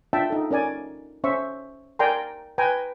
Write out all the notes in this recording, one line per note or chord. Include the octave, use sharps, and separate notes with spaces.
D4 F4 E5 G5 A5
D#4 A4
C#4 A#4 D5 G#5
C#4 C5 E5 C#6
A#4 D5 G5 G#5 A#5 C6
B4 G5 G#5 A#5